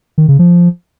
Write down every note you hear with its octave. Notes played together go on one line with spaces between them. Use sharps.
D#3
C#3
F3